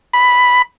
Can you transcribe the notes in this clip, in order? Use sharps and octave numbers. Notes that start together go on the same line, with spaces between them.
B5